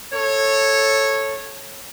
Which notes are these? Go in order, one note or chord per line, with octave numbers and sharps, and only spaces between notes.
A4 C#5